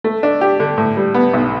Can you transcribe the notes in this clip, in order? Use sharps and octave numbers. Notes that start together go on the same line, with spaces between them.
A3
D4
G4
D3
A2
G3
B3
B1